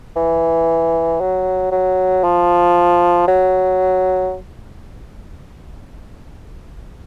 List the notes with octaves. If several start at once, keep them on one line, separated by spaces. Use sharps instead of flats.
E3
F#3
F#3
F3
F#3